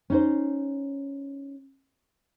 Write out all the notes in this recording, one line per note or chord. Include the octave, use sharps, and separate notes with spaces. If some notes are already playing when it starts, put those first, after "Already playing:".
C#4 D#4 C5